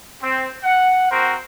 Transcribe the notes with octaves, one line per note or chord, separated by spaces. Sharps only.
C4
F#5
C4 F#4 A#4 C5